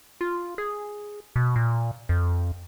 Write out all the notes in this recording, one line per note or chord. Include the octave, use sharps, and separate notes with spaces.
F4
G#4
B2
A#2
F2